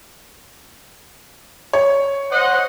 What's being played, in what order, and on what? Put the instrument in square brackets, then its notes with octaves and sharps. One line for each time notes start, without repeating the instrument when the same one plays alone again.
[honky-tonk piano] C#5
[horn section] C5 D#5 F#5